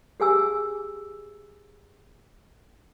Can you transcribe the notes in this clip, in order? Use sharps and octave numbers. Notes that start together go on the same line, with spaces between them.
G4 G#4 G#5 E6